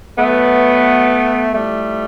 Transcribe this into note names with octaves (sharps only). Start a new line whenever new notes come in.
B2 F#3 A3 B3
A2 F3 G3 A3